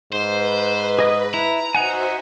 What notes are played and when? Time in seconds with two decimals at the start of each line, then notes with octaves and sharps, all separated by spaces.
0.13 G#2 B4 C5
0.99 G#4 D#5 D#6
1.34 E4 A#5
1.75 D#4 F#4 C5 E5 F#5 G#5